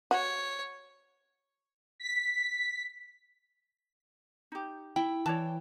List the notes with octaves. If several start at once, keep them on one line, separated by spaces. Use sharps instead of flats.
F#4 C#5
B6
D#4 G4
E4 G5
E3 C#5 D5 A5